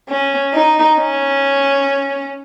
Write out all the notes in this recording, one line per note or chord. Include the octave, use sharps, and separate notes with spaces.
C#4
D#4
C#4